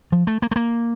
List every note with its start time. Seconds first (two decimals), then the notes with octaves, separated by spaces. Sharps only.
0.12 F3
0.27 A3
0.42 A#3
0.51 A3
0.56 A#3